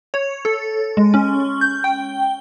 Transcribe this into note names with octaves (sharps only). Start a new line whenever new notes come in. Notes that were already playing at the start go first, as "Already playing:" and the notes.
C#5
A4
G#3
C#4
G6
G5